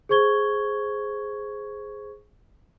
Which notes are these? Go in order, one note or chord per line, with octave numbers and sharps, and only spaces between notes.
G#4 C5 C#6 G#6 G7